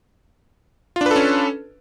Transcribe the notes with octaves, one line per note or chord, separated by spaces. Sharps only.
C#4 D4 F4 A4 B4